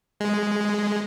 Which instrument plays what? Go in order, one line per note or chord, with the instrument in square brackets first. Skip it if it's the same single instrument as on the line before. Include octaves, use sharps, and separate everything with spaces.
[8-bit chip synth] G#3